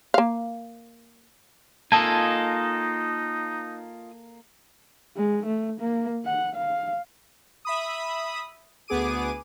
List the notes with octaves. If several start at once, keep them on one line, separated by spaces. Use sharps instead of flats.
A#3 F5
A#3 D#4 F4 A4 D#5 G#5 A5
G#3
A3
A#3
F#5
F5
E5 B5 D#6
D2 B3 G#4 D6 D#7